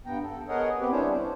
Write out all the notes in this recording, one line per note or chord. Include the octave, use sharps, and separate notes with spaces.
G2 B3 G5 A#5
A4
B3 G#4 A#4 C#5 D#5 F#5
B3 C4 G4 B4
G3 C#4 D4 E4 C5 C#5
C5